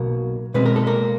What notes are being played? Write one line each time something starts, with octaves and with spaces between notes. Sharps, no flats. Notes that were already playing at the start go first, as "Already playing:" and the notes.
Already playing: B1 B2 F#3 A#3
B2 G#3 C4 B4
A#4
A4
A#3 A#4